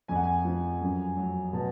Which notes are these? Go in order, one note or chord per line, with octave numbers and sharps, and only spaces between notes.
F2 G#5
F#5
G#5
F3
F#2
F#3
B2 A5